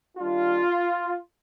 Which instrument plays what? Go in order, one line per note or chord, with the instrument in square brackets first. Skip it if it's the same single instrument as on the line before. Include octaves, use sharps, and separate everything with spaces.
[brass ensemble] D#3 G3 D4 F4